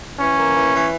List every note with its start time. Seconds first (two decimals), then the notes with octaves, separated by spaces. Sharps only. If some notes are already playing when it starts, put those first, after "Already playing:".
0.20 E3 C#4
0.39 A#3
0.56 E3
0.73 E3